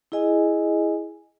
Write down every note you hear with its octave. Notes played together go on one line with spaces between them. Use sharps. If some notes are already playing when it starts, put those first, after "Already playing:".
E4 G#4 D#5 G#5